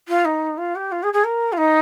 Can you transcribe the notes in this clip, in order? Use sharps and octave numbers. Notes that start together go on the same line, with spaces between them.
F4
D#4
F4
G4
F4
G#4
G#4
A#4
F4
D#4